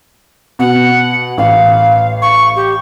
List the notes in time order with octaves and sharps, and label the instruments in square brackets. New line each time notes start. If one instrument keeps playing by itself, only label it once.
[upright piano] B2 [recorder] F#5
[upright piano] A1 [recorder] F5
[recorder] C#6
G4